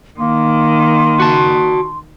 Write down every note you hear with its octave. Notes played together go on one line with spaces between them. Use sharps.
D#3 A#3 C6
F#4 A5